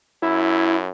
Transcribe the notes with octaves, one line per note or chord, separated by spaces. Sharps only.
F#2 E4